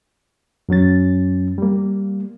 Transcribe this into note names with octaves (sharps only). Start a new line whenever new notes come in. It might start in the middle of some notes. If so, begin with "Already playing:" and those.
F#2 F#3 C#4 A6
G3 A#3